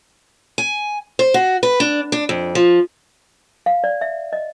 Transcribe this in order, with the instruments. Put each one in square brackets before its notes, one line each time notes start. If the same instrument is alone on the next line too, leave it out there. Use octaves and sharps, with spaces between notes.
[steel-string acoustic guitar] G#5
C5
F#4
B4
D4
D4
F2
F3
[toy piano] F5
D5
E5
D#5